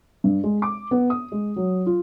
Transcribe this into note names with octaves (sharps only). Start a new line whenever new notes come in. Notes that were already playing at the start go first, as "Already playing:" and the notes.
G2
G#3
D6
B3
D#6
G#3
F#3
F4